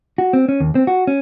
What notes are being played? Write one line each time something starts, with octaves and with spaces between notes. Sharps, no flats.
F#4
C4
C#4
D#2
C4
F#4
C#4